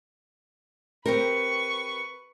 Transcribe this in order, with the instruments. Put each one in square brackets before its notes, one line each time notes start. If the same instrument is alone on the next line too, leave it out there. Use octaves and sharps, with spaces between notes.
[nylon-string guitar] C4 G4 A#4 [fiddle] B4 C#6